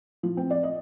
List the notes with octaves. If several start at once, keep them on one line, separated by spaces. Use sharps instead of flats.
F3
C4
D5
D#5